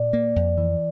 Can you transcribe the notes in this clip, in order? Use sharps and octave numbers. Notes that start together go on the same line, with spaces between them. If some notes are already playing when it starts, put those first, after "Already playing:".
Already playing: A#2 D5
A#3
F2
E3